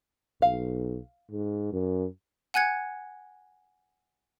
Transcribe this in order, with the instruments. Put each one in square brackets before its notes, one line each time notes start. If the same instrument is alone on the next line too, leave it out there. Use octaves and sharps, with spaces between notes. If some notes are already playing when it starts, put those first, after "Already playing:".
[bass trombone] B1 [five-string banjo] F5
[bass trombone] G#2
F#2
[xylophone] F#5 G#5 F#6 G#6 C#7